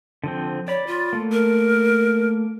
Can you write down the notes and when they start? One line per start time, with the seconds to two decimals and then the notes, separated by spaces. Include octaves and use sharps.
0.24 D3 F3 C4
0.68 C#5 D5 B5
0.87 F4
1.13 A3 A#3
1.32 A#4